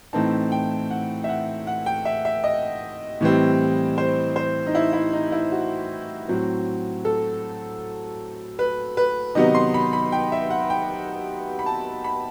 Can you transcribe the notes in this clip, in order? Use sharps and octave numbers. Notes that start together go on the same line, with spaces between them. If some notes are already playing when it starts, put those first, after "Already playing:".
A2 E3 A3 C4 D#4 A5
G5
F#5
E5
F#5
F#5
G5
E5
E5
D#5
A2 E3 G3 C4
C5
C5
D#4
E4
E4
D#4
E4
F#4
A2 F#3 C4
A4
B4
B4
C3 D#3 F#3 B3 D#4 D#5
C6
B5
B5
G5
E5
F#5
G5
B5
A5
B5